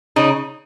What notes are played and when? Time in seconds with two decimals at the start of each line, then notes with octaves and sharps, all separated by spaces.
0.16 C#3 D#4